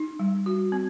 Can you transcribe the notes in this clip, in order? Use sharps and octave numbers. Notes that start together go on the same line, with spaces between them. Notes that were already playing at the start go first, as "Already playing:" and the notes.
Already playing: D#4
G3
F#4
C4